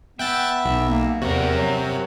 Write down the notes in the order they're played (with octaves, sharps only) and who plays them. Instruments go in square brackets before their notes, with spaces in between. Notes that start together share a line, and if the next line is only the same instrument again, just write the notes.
[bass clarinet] B3 [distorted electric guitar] E5 [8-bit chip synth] G5 F#6 A6
[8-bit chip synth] B1
[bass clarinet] A#3
[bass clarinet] E2 [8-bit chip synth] C3 [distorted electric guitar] F#4 A#4
[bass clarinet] F#3